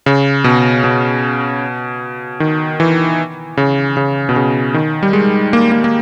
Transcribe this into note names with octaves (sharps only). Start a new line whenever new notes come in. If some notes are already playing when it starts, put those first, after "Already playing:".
C#3
B2
B2
D#3
E3
C#3
C#3
B2
C#3
D#3
G3
G#3
A#3
A#3
A#3